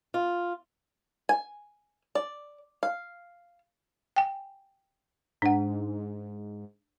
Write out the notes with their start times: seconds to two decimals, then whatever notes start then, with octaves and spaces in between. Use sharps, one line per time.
0.14 F4
1.29 G#5
2.15 D5
2.83 F5
4.16 G5 G#5
5.42 G#2 D4 F#5